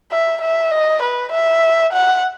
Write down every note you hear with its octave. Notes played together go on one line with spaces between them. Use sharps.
E5
E5
D#5
B4
E5
F#5